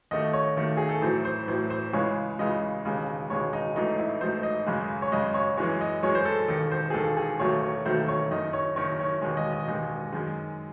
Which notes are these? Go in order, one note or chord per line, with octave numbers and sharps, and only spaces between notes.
D#2 D#3 A3 D#5
C#5
D#2 D#3 A3
G#4
A4
A1 A2 F#3 C5
C5
A1 A2 F#3 C5
C5
C#2 C#3 E3 G#3 C#5
C#2 C#3 E3 G#3 D#5
E1 D#2 C#3 G#3
E1 D#2 C#3 G#3 C#5
D#4
A1 G#2 F#3 A3 D#4
E4
A1 G#2 F#3 A3 C5
D#5
G#1 F#2 C#3 G#3
C#5
G#1 F#2 C#3 G#3 D#5
C#5
F#2 E3 G#3 C#5
D#5
F#2 E3 G#3 C#5
C5
A4
E1 D#2 D#3 A4
C5
G#4
E1 D#2 D#3 A4
G#4
E1 D#2 D#3 F#3 A3 C#5
C#5
E1 D#2 D#3 F#3 A3 C5
C#5
F#1 F#2 D#3 D#5
C#5
F#1 F#2 D#3 C#5
C#5
E1 D#2 D#3 G#3 C#5
D#5
D#5
E1 D#2 D#3 G#3
F#2 D#3 G#3